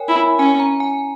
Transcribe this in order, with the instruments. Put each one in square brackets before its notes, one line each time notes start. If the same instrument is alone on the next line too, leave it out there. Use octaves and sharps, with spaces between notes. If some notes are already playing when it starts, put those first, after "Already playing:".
Already playing: [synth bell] A#4 C#5 G5 G#5
[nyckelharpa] E4
[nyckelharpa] C#4 [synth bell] G#5
[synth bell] A#5
G#5